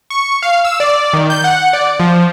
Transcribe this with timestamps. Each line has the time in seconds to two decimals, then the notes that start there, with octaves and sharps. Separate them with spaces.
0.10 C#6
0.42 F5
0.65 E6
0.80 D5
1.13 D#3
1.30 G6
1.44 F#5
1.73 D5
2.00 F3